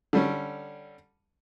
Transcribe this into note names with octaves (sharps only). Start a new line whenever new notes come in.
D3 G3 C#4